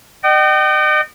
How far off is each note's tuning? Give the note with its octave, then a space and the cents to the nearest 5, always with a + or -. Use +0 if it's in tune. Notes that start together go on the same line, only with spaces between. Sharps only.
D#5 -40 G5 -40